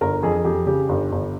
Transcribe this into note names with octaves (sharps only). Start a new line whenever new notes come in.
G1 A#4
F2 G#4
F2 G4
C#3 G4
G1
G1